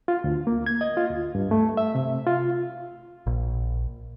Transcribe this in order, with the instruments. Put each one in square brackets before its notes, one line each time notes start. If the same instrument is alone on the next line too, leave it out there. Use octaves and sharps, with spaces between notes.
[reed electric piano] F4
D2
A#3
G#6
D#5
F4
D2
G2
A3
E5
C3
F4
[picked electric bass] A#1